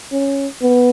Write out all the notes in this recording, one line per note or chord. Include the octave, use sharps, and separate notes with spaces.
C#4
B3